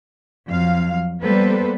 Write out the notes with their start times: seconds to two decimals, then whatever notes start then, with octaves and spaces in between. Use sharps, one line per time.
0.49 F2 F#3 F5
1.22 G3 A#3 B3 A4 B4 C5